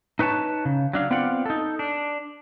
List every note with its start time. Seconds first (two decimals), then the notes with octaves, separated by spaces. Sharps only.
0.19 D#4 B4 C#5 G5 A5
0.65 C#3
0.93 F#3 D4 F5
1.11 B3 C4 F4 D5 F5 F#5
1.46 D#4 A4
1.79 D4